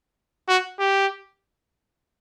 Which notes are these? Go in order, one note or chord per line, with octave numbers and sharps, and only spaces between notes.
F#4
G4